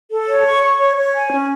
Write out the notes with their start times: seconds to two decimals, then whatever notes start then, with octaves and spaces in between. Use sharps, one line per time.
0.10 A4
0.28 C#5
0.46 C#6
0.63 C#6
0.79 C#5
0.97 C#5
1.14 G#5
1.31 C#4